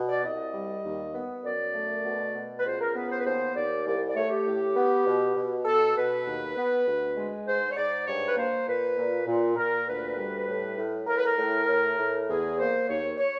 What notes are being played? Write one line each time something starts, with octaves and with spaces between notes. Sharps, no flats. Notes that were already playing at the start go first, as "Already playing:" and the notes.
Already playing: B2
D5
C2 D#5
G3
D#2
B3
F#2 D5
A3
B2
B2
B4
C#2 C5
A#4
B3 B4
C5
B4
D#2 C5
D#2 D5
C2 D5
D5
A3 C#5
G4
A2
B3
B2
B2
B2 A4
B2 B4
D#2
B3
D2
G#3
G#2 C5
C#5
G#2 D5
G2 C#5
B4
A#3 C5
A#2 B4
A#2
A#2
A#2 A#4
D2 B4
G3
A2
A2
A2 A#4
B4
A#4
A2
A2
A2
E2 G#4
A#3 C5
D#2 C#5
C#5